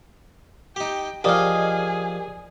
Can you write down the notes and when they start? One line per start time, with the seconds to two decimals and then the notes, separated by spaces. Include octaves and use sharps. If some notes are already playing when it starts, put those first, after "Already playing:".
0.76 D#4 G4 G5
1.24 F3 G4 G#4 A#4 D5 D#5 F5